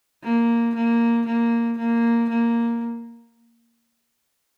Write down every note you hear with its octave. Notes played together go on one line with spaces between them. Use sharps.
A#3
A#3
A#3
A#3
A#3